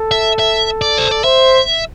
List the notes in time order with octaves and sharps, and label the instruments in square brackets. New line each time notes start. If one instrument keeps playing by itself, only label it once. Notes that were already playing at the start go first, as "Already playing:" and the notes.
Already playing: [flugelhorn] A4
[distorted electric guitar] E5
E5
D5
C5
D5
[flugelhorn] C5 [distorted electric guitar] E5